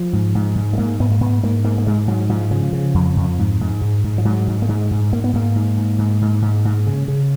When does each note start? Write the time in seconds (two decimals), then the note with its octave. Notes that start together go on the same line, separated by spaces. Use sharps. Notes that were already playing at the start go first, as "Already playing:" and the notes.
Already playing: F3
0.13 G#2
0.35 G#2
0.56 G#2
0.73 G#3
0.78 G#2 A#3
1.00 G#2 B3
1.12 A#3
1.21 G#2 B3
1.43 G#2 A#3
1.64 G#2 A#3
1.78 A#3
1.86 G#2 G#3
2.08 G#2 F#3
2.29 G#2 F3
2.51 C#3 F3
2.73 C#3
2.94 F2
3.17 F2
3.39 G#2
3.61 G#2
3.81 G#2
4.04 G#2
4.18 F3
4.25 G#2 F#3
4.47 G#2
4.62 A#3
4.69 G#2 G#3
4.91 G#2
5.13 G#2 A#3
5.24 B3
5.33 G#2 A#3
5.56 G#2
5.78 G#2
5.99 G#2
6.22 G#2
6.42 G#2
6.65 G#2
6.87 C#3
7.08 C#3